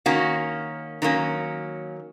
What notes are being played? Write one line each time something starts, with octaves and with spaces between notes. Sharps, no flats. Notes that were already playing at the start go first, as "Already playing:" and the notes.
D#3 A#3 C#4 F#4
D#3 F#3 A#3 C#4 D#4